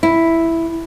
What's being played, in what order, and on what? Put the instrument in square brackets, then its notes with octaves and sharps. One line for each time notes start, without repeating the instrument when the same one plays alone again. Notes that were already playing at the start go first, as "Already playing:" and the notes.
[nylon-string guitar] E4